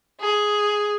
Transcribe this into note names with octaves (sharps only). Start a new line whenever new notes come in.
G#4